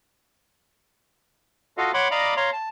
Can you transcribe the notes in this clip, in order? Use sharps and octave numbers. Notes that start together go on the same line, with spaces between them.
F4 F#4 A4 D#5 F5
C#5 F#5 B5 C6 D6
D5 D#5 F5 A#5 B5 D6
C#5 F5 A#5 C6
A5